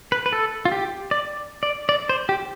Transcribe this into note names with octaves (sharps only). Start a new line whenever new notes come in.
B4
B4
A4
F4
G4
D5
D5
D5
C5
G4